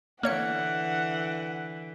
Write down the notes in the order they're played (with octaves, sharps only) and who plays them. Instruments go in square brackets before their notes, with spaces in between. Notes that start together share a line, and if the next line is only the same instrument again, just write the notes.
[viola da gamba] D3 E3 [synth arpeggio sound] A#3 C#5 C#7 [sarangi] F#5